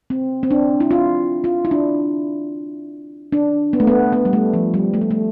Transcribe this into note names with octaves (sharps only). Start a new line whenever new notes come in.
C4
C4
D4
E4
F4
F4
E4
D4
D4
B3
A3
B3
B3
G3
A3
F3
G3
A3
G3
A3